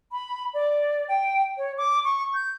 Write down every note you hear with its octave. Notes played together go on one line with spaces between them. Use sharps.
B5
D5
G5
C#5
D6
C#6
G6